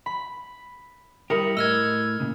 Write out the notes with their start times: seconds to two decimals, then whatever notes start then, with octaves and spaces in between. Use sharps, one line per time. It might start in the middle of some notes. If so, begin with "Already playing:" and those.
0.06 B5
1.30 G3 E4 G4 A#4 D#6 C#7
1.57 A2 D#5 E6 F6 G#6
2.20 A#2 C#3